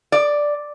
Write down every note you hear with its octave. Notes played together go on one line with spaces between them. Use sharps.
D5